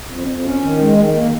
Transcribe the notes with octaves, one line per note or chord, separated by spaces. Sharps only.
F2
F2
C#4
D#3
G#3
D#3
A#3